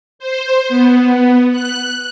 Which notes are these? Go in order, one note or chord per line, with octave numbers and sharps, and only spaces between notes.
C5
B3
F#6